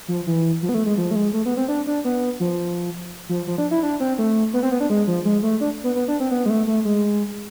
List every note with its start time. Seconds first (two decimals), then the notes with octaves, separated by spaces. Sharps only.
0.08 F3
0.27 E3
0.63 F3
0.69 B3
0.74 A3
0.86 G#3
0.98 F3
1.11 A3
1.16 G#3
1.33 A3
1.46 B3
1.57 C4
1.68 D4
1.87 D4
2.05 B3
2.40 F3
3.29 F3
3.47 F3
3.58 D4
3.71 E4
3.83 D4
4.00 C4
4.18 A3
4.54 B3
4.63 C4
4.72 B3
4.80 D4
4.90 G#3
5.07 F3
5.25 G#3
5.43 A3
5.61 D4
5.84 B3
5.95 B3
6.08 D4
6.20 C4
6.31 B3
6.46 G#3
6.50 A3
6.67 A3
6.85 G#3